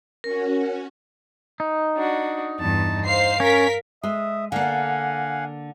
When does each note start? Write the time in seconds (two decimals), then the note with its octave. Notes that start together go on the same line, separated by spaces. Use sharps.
0.24 C#4 F#4 A#4
1.60 D#4
1.95 D4 F#4
2.59 E2 G2 A5
3.06 C5 F5 C7
3.40 C#4 A#4 B6
4.03 G#3 E5 D#6
4.52 D3 A#3 F5 F#5 G#5